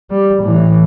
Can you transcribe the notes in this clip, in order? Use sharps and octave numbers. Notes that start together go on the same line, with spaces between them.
G3
A2 E3